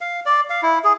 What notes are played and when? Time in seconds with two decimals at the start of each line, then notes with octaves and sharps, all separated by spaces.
0.01 F5
0.26 D5
0.50 F5
0.63 E4
0.84 G#4